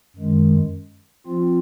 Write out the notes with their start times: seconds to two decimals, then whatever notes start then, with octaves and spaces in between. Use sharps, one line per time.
0.16 F#2 D#3 G#3
1.26 F3 C4 F4